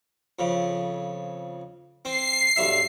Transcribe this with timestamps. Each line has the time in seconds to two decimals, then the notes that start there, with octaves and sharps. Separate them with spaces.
0.39 F2 C#3
2.05 C4 C7
2.56 B1 G2 E5